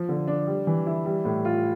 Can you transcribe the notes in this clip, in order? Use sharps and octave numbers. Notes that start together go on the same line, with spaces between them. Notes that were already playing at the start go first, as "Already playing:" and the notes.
Already playing: F3
D3
D4
G3
E3
E4
G3
A2
F4